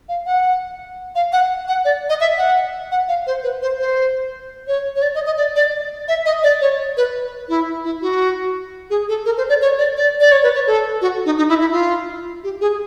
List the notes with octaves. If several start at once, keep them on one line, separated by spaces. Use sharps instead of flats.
F5
F#5
F5
F#5
F#5
D5
D#5
E5
F#5
F#5
F5
C5
B4
C5
C5
C#5
C#5
D5
D#5
D#5
D5
D5
E5
D#5
D5
C#5
B4
E4
E4
F#4
G#4
A4
A#4
C5
D5
C#5
D5
D5
D5
C#5
B4
C#5
A4
F#4
D#4
D#4
E4
E4
F4
G4
G#4